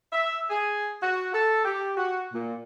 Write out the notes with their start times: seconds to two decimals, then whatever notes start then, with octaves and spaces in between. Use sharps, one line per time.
0.12 E5
0.50 G#4
1.02 F#4
1.33 A4
1.65 G4
1.96 F#4
2.33 A#2